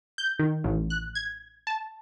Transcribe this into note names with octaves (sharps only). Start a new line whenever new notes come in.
G6
D#3
A1
F#6
G#6
A5